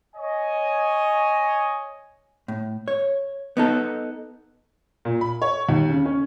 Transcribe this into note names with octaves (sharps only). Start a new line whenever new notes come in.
C#5 D#5 G#5
A2
C#5
B3 D#4 A4
A#2
B5
C#5
D#2
C#3
C#4